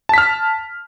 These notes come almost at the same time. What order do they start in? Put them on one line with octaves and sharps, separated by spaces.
A5 B6 F6